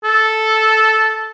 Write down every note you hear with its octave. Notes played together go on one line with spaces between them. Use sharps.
A4